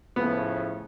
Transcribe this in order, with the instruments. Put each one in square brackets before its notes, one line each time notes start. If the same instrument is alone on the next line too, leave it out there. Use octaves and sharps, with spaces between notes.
[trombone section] A2 C#3 F3 [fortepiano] B3